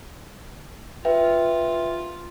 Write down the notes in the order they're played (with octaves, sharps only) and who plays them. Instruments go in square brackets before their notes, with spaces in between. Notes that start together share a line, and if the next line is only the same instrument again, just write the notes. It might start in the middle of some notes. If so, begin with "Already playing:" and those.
[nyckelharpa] F4 [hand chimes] B4 E5 G5